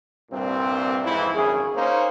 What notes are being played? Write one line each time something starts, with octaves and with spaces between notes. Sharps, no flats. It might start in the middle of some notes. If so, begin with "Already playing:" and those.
C2 G2 A#2 C4
F2 G#2 E3 C4 E4
G#1 F#2 C#3 G#4
A#3 C#4 D#4 C5